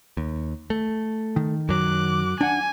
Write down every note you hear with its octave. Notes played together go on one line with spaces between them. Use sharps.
D#2
A3
D#3
F#2 F#3 D6 F#6
D4 F#5 G#5